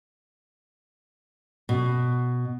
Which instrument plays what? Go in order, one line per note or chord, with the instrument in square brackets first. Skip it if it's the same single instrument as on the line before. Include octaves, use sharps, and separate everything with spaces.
[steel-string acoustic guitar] B2